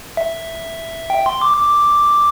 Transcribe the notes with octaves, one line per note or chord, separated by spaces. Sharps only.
E5
G5
C6
D6
D6